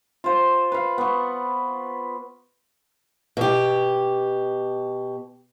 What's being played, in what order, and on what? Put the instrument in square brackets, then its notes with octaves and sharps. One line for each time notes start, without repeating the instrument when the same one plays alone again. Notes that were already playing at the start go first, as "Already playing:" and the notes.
[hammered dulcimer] F4 C5
B4 F5
B3 C#6
[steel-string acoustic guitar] B2 G4